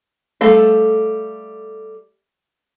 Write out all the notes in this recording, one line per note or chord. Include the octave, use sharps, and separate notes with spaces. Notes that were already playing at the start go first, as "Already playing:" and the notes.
G3 A3 A4 F5